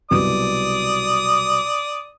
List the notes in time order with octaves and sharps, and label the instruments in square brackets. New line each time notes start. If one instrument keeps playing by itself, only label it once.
[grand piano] C2 B2 F#3 [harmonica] D5 D#6